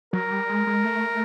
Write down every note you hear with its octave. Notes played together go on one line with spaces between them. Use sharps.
F#3 A#4
G3
G#3
G#3
A3